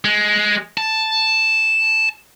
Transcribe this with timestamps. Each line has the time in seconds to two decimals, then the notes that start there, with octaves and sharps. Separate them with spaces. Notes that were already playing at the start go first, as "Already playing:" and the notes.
0.04 G#3
0.78 A5